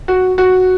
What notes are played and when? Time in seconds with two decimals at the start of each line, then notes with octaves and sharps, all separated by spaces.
0.08 F#4
0.38 F#4